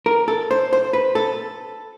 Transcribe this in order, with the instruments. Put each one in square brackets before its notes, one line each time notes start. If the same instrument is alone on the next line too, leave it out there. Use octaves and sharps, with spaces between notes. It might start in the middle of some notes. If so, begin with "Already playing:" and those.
[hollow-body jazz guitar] A#4
A4
C5
C5
B4
A4